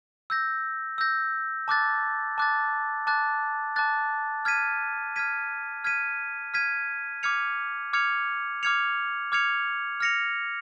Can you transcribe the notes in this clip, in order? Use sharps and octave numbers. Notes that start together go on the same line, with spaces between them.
E6 G6 A#6
E6 G6 A#6
A5 D6 F#6 A6
A5 D6 F#6 A6
A5 D6 F#6 A6
A5 D6 F#6 A6
F6 G#6 B6 D#7
F6 G#6 B6 D#7
F6 G#6 B6 D#7
F6 G#6 B6 D#7
D6 F6 G#6 C#7 F7
D6 F6 G#6 C#7 F7
D6 F6 G#6 C#7 F7
D6 F6 G#6 C#7 F7
F6 A#6 C#7 F7